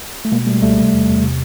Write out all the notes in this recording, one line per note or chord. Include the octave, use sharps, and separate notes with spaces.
A3
B2 G#3 A#3
B2 G3 A3
C#2 G3 A3
C3
E2
E2
C3